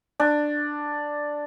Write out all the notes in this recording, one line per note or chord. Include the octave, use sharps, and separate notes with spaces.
D4